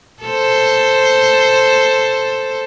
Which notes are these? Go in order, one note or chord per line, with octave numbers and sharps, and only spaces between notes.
A4 C5